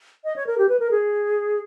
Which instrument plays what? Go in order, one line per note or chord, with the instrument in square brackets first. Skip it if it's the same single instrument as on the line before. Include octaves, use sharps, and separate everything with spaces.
[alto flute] D#5
C#5
A#4
G4
B4
A#4
G#4